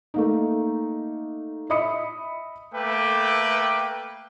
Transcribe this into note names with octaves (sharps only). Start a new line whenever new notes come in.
A3 A#3 D#4
D#5 E5 B5 D#6 C#7
A3 A#3 B4 G5 D6